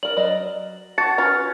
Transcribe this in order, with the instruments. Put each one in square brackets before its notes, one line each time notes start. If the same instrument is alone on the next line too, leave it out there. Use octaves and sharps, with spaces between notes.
[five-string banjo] A#4 D5 [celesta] F#7
[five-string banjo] F#3 D5 D#5
[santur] F#4 [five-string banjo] A5 [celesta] A6 C#7
[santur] C#4 [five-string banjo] F4 B4 A#5